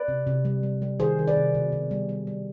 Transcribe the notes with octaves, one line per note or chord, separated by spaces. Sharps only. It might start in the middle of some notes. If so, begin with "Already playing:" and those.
Already playing: B4 D5
C3
C3
G3
G3
G3
D#3 G#4 C5
D#3
B4 D5
C3
B2
B2
G3
G3
G3